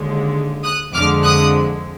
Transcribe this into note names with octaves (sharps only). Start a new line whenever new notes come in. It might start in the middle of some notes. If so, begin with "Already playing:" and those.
Already playing: D#2 D3 G#3
D#6 F#6
F2 D3 G#3 D6 F6
D#6 F#6